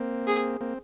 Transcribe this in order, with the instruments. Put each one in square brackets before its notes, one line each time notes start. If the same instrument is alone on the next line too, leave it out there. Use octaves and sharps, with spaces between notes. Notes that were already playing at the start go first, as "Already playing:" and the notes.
Already playing: [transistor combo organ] A#3 C4
[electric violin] G#4
[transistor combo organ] A#3 C4